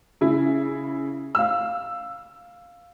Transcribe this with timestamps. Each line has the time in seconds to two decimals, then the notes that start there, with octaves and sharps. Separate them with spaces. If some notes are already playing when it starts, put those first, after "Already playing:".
0.21 C#3 E4
1.35 F5 E6